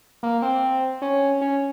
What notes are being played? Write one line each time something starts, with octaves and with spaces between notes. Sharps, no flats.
A#3
C4
C#4
C#4